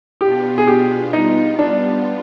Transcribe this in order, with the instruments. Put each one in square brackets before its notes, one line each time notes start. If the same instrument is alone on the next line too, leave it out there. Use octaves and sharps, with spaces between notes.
[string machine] B2 B3 D4 F4 [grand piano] G4
[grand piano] G#4
G4
[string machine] G3 B3 F4 [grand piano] D#4
[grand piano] D4